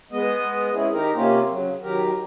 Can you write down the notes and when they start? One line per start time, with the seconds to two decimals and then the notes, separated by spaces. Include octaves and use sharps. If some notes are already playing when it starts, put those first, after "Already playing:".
0.11 G#3 B3 D#5
0.73 C4 C#4 E4 G#4
0.92 D#3 D#4 G4 A#4
1.14 C3 A#3 C4 C#4 F4 G4
1.48 C#3 F#3
1.82 D#3 F#3 G4 A#4